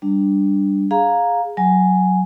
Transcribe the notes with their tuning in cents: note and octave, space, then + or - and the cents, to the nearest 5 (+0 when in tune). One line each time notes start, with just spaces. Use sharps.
G3 +0 D4 +0
G#4 +0 F5 +15 A#5 +0
F#3 +0 G#5 +0